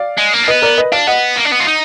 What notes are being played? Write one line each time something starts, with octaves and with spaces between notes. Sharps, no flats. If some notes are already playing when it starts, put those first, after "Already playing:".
Already playing: D5 F5
G#3
A#3
D4
B3 B4 D#5
A#4 D5
B4 D#5
D4 D5 F5
B3 D#5 F#5
A#3
D4
B3
F4
D#4